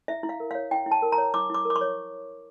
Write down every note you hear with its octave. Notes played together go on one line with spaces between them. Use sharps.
E4 E5
E4
F5
A#4
C#5 F5
E4 G5
E4
A5
A#4
A#5
C#5
E4 D6
E4 D6
A#4
D6
C#6
C#5